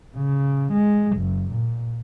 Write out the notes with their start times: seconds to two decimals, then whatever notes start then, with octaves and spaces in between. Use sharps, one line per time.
0.16 C#3
0.73 G#3
1.18 F#1
1.52 A#2